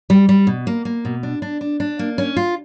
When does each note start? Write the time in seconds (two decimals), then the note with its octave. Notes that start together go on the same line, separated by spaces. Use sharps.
0.10 G3
0.29 G3
0.47 B2
0.67 A#3
0.85 A#3
1.05 B2
1.23 D4
1.42 D4
1.61 D4
1.80 D4
1.99 A#3
2.18 C#4
2.36 F4